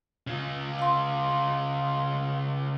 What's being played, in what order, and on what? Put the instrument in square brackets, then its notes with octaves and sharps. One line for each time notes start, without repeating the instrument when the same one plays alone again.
[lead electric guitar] C#3 F4
[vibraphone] F5 C6